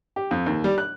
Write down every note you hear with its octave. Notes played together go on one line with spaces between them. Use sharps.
G4
F2
D#2
G3
F#6